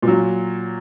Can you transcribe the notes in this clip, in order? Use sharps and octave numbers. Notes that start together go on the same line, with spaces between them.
A#2
F#3